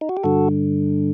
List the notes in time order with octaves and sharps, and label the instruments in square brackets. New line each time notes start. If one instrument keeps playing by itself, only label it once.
[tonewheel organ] D#4
F#4
G4
G2 D3 F#4 A4